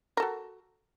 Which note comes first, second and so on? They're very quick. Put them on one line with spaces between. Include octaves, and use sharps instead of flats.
A#4 A4 F#4